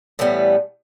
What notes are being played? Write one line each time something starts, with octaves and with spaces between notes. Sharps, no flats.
A2 E3 G3 B3